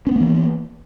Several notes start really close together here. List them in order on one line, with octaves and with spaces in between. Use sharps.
C#4 B3 A#3 E3